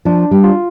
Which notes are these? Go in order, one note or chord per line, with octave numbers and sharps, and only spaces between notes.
F3 D4
G3
F4